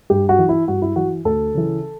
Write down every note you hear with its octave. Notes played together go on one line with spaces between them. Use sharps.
G2 G4
F#4
E3
E4
G2 F#4
E4
E3 F#4
D2 A4
C#3 E3